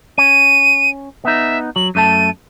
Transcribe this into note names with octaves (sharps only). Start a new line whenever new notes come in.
C#4 D#7
B3 D#4 E5
F#3 F#7
F#2 A3 A5 D#7